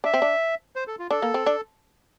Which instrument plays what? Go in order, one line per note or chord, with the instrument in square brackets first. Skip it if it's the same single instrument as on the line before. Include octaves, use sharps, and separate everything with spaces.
[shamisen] D4 [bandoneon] E5
[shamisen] C4
D4
[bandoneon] C5
A4
F4
[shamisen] D4 [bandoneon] A4
[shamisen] A#3
C4
D4